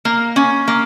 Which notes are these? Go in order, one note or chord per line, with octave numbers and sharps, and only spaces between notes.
A#3
C#4
A#3